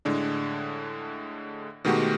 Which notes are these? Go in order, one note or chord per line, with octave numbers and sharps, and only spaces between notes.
A2 D3 G#3 D4
B2 D#3 G#3 A3 F#4 G4